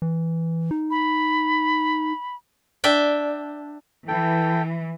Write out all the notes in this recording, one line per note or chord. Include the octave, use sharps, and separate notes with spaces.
E3
D#4
B5
D4 E5 G5
E3 A4 G5